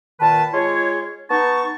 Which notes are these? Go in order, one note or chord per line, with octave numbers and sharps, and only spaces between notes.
A#2 D#3 B4 A5
G#3 F4 C#5
B3 D#4 A5 C#6